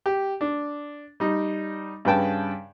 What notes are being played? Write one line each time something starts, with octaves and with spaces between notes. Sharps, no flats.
G4
D4
G3 D#4
G2 C#3 B4 G5 A5